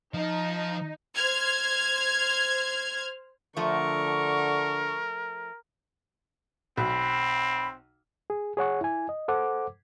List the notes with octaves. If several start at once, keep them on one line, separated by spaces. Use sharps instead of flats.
F3 D#4
C5 F6 G#6
D3 F3 A3 A#4 C#6
B1 C4 B5
G#4
G#4 C#5 F#5 C#6
E4 G#5
D#5
A4 C5 F#5 D6